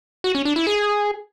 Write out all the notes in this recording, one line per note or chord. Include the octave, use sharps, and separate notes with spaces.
F#4
C#4
D4
E4
G#4